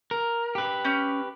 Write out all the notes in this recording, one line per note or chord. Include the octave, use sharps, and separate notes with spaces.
A#4
G4 B4
C#4 G6